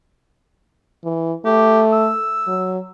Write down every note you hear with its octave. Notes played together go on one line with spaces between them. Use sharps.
E3
A3 G4
E6
F#3